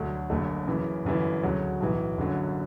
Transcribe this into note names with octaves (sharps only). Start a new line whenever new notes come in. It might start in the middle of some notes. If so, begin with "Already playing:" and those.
Already playing: D2 D3 F#3 A3 D4
F#1 F#2 D3 A3
F#2 C#3 E3
G1 F#2 E3
D2 C#3 F#3
B1 A2 E3
F#1 F#2 D3 F#3